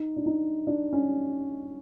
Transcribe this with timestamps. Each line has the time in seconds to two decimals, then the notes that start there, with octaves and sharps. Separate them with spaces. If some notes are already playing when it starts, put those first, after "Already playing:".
Already playing: D#4
0.16 D4
0.26 D#4
0.67 D4
0.93 C#4